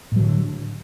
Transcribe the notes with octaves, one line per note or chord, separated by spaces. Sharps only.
A2 D3 F#3